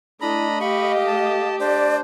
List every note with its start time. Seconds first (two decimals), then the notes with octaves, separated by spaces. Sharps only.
0.21 A3 D4 E4 D#5 A#5 B5
0.60 G4 F5 B5 C#6
1.07 A5
1.60 D4 C5 D5